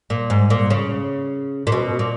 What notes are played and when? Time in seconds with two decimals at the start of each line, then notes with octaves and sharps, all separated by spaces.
0.10 A#2
0.30 G#2
0.50 A#2
0.70 C#3
1.67 A#2
1.72 B2
1.99 A#2